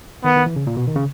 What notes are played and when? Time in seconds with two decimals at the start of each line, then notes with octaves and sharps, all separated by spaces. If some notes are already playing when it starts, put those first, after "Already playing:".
0.24 D#3 B3
0.36 D#3
0.46 E3
0.56 C#3
0.67 A#2
0.77 B2
0.88 D#3
0.96 C#3